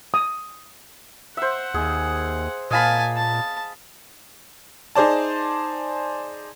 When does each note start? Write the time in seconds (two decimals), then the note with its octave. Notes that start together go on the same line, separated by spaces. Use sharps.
0.14 D#6
1.37 C5 E5 F#5
1.74 D#2 G#4
2.71 A#2 D#5 F5 G#5 A5 B5
3.16 A5
4.95 D#4 G#4 C5 D5 A5